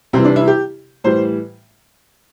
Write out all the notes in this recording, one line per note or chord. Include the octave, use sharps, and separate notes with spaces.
C3 E3 G3 C4
D4
E4
G4
A2 E3 G3 C5